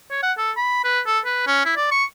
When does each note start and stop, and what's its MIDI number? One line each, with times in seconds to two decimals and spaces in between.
0.11 0.18 73
0.23 0.32 78
0.38 0.51 69
0.56 0.82 83
0.84 1.00 71
1.07 1.19 69
1.25 1.46 71
1.47 1.65 61
1.65 1.73 64
1.77 1.90 74
1.91 2.04 85